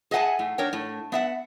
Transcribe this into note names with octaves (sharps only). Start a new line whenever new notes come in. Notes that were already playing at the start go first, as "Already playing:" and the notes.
G#4 D#5 E5 F#5 G#5 A5
A2
D4 A#4 C#5 G5
A2
B3 E5 F#5